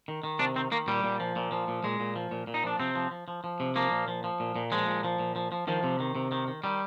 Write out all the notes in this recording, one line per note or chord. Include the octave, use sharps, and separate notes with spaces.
D#3
D#3
C3 D4
D#3 C4
D#3 A#3
A#2 G3
A#2
F3
A#2
F3
A#2
A#2 G#3
A#2
F3
A#2
A#2
D#4
F3 D4
C3 C4
F3
F3
F3
F3
C3
F3 A#3
A#2
F3
F3
A#2
A#2
F3 G#3
A#2
F3
A#2
F3
F3
D#3 F3
C3
D#3
C3
D#3
D#3
D#3 G3